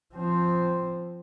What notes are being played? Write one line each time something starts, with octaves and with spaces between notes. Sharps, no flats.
F3 C4